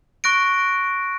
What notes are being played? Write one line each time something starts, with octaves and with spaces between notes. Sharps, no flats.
C#6 F#6 A#6 D7